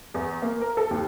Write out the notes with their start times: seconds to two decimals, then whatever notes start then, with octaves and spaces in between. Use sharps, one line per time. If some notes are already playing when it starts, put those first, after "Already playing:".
0.14 E2
0.42 A#3
0.61 A#4
0.77 A4
0.91 D#2